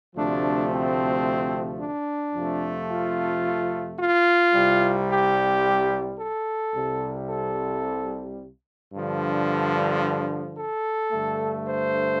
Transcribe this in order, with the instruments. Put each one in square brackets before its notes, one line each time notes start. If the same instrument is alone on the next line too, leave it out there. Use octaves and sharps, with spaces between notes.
[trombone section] D2 C3 F3 A3 D4
C4
D4
F2 C3 F3 A3
F4
F4
C2 C3 G3
G4
A4
C2 C3 G3
A4
G2 D3 F3
A4
G2 D3 A3
C5